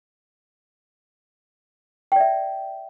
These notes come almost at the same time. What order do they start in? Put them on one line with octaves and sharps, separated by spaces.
G5 D5 E5